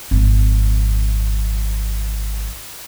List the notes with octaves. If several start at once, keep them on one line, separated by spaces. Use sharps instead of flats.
G#1 F2